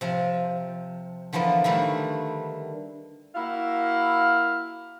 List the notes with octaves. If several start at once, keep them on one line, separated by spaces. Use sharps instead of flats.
C3 F3
D3 E3 F3 A#3 B3
D3 D#3 G3 A3
A#3 E4 F#4 F5